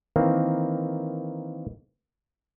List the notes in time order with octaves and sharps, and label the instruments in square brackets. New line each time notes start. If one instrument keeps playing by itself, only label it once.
[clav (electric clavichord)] D#3 E3 A#3 C4